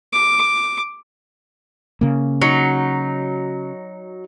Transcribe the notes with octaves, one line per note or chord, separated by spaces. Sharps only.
D6
C#3 A#3
F#3 D#4